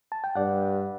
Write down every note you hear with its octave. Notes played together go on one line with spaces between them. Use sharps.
A5
G5
G2 D5 F#5